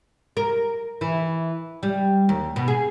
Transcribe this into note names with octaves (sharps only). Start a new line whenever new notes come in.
A#4
E3
G3
D#2
B2
G#4